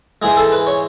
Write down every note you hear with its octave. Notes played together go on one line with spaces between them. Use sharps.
G#2 E3 G#3 G#4
A4
B4
C#5